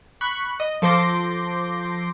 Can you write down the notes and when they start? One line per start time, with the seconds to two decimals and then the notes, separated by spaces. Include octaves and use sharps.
0.21 B5 C#6 F#6
0.60 D#5
0.82 F3 A4 C6 D6 G6 A#6